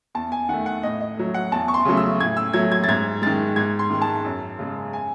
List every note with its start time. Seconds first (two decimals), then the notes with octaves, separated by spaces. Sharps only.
0.15 E2 A5
0.32 G#5
0.49 D#3 A3 F#5
0.66 F#5
0.83 A2 D#5
1.01 D#5
1.17 F#3 A3
1.34 F#5
1.52 E2 A5
1.68 C#6
1.74 C6
1.85 C#3 F#3 A3
1.97 E6
2.20 A2 G#6
2.37 E6
2.53 F#3 A3 G#6
2.72 G#6
2.84 A6
2.88 G#2 G#6
3.22 D#3 G#3 A6
3.56 G#2 G#6
3.79 C6
3.90 D#3 G#3
4.02 A5
4.25 F#2
4.59 C#3 G#3
4.93 G#5